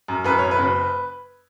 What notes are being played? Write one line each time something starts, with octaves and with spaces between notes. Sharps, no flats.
F#2
F#2 B4
F#2 C#5
B4
F#1